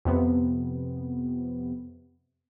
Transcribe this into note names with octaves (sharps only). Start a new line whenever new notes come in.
F2 C3 B3